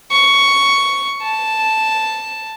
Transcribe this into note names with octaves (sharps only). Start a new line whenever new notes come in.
C#6
A5